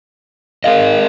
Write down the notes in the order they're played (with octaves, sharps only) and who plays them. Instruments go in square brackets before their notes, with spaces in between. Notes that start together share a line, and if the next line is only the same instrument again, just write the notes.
[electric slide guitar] G#4 A#4 D#5 [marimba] F5